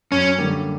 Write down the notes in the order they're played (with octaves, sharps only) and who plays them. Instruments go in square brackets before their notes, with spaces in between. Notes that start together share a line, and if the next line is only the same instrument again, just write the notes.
[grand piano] F#2 [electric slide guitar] C#4
[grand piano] D3 G3 A#3